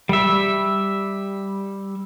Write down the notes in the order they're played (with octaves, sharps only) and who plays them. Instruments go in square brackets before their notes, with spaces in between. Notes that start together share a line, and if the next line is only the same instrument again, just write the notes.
[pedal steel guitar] G3 E5